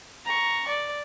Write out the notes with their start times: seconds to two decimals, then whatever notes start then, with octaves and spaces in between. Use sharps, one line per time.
0.25 A#5 C#6
0.68 D5